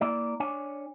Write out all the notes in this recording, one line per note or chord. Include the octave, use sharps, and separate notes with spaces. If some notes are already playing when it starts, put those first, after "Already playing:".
A#3 E4 D5
D4 C#5 G#5